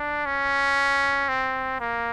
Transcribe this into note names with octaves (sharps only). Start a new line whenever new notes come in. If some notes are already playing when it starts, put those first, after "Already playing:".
Already playing: D4
C#4
C4
A#3